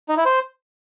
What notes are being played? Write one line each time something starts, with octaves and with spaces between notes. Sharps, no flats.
D#4
E4
C5